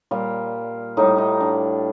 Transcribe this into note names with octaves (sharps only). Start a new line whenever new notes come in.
A#2 G3 F4
A2 G3 D#4
D#4
D4